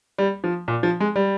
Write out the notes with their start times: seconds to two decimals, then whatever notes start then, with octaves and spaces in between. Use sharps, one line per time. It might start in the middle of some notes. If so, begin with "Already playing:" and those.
0.18 G3
0.44 F3
0.68 A#2
0.83 F3
1.00 G#3
1.16 G3